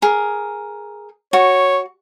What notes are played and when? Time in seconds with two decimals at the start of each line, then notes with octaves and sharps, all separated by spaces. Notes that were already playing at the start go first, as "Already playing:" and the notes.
0.02 G#4 A#4
1.33 F#4 C#5